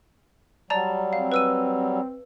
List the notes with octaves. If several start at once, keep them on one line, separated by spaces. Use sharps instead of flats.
F#3 G3 D5 A5 A#5
C4 F5
B4 E6 D#7